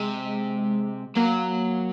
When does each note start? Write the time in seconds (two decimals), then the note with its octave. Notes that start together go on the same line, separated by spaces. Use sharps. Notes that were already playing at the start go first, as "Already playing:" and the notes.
Already playing: C3 G#3
1.15 F#3 A#3